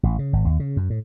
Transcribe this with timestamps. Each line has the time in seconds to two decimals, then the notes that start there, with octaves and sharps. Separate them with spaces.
0.03 A1
0.19 C#3
0.33 G#1
0.45 D#2
0.60 C#3
0.77 F#2
0.90 A2